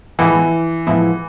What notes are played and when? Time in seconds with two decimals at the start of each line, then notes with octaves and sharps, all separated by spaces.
0.19 A2 E3 F3 G#3 B3 E4
0.87 A2 F3 G#3 B3 E4